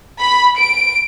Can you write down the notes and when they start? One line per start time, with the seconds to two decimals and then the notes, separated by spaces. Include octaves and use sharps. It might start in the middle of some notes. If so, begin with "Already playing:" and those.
0.19 B5
0.58 D7